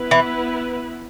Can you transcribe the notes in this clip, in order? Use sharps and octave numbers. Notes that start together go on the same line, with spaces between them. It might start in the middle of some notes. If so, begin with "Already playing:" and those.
Already playing: B3 E4 B4
E3